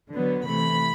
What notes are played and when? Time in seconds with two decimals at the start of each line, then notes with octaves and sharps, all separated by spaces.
0.11 D3 F#3 B3
0.47 C3 E3 A3 B5